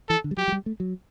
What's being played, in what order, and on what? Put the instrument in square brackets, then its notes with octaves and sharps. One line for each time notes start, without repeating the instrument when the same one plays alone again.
[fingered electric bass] E3 [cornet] A4
[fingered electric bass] D3
G3
[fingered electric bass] F#3 [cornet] G4
[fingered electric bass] F#3
G3
A3
F#3